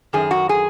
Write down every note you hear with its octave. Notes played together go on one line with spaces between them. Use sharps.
F#2 D#3 G#4
F#4
G#4